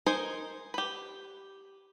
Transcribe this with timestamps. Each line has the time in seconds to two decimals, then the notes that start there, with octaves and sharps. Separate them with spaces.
0.06 D#4 A#4 C5 D#5 G#5
0.74 G4 B4